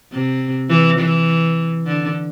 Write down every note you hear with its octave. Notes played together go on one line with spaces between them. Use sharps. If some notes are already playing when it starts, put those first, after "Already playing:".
C3
E3
E3
D3